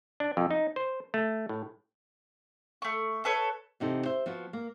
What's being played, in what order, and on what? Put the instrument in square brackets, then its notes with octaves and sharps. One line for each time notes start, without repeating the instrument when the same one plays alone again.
[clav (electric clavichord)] D4
F2
D#4
C5
A3
A2
[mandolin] A3 C#6
A4 B4 C#5
[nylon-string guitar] E2 C3 D#4 A4
C5 E5
F3 B3 F4 F#4
A#3